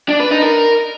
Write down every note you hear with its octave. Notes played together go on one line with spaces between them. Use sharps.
D4
B4
D#4
A#4